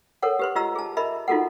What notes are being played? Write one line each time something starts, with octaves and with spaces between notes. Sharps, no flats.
A4 A#4 C#5 F#5
G4 B4 C6
F4 G4 D#5 A#5 E6
G#4 A5
A#4 D#5 E5 B5
D#4 F4 F#4 A4 A#4 F#5